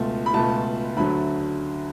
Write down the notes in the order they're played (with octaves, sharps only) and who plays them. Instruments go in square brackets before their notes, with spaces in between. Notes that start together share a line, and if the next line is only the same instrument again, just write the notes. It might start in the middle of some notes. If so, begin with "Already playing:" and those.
Already playing: [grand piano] C#2 B2 A3 F4
B5
C#2 B2 A3 F4 A5
D2 D3 F#3 A3 B5